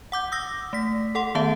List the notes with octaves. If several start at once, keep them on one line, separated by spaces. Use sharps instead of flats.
F#5 D6 G6
D#6 E6 A#6
A3 B6
A4 F#5 C6
D#3 A3 B3 E5 F5 A5